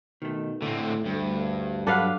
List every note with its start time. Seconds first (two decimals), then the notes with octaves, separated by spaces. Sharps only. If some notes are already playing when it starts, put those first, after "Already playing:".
0.22 B2 D#3 A3
0.62 A2 D3 A3 C4
1.06 D2 G2
1.87 F#3 D4 A4 B4 F5 F#5